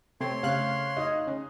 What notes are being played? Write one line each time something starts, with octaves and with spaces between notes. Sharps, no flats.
C3 A3 C4 C#5 C6
C#3 A3 C4 F5 F#6
D#4 D#5
C#3